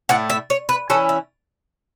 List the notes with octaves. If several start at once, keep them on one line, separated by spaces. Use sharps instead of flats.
A2 A3 E4 F#5
E5
C#5
B4
E3 C#4 E4 A4
E5